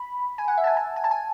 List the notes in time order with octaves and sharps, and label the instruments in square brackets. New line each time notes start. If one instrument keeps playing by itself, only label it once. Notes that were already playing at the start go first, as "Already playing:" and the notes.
Already playing: [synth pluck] B5
G#5
F#5
E5
A5
G#5
A5
G#5
A5
G#5